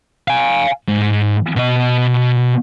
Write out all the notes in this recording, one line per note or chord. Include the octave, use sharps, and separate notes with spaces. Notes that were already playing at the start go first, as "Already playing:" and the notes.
F5 G#5
G#2
B2 D#5